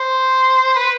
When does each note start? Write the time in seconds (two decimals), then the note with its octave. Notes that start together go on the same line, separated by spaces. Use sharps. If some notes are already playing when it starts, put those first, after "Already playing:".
Already playing: C5
0.76 B4